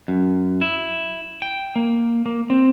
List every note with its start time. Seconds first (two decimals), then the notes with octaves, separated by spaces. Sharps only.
0.08 F#2
0.61 E4
1.42 G5
1.76 A#3
2.26 A#3
2.50 C4